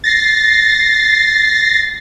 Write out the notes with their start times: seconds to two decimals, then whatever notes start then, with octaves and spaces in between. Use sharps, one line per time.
0.04 A6 A#6 C7